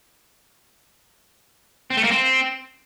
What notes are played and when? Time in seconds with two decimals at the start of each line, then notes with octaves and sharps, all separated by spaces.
1.90 C4
1.97 A3
2.04 A#3
2.10 C4